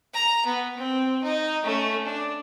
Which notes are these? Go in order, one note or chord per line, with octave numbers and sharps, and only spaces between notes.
A#5
B3
C4
D#4
A3 C#4
D4